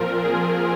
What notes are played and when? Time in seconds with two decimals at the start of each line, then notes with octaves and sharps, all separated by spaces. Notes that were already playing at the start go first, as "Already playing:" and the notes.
Already playing: A#2 F3 C4 F4 A#4
0.24 G#4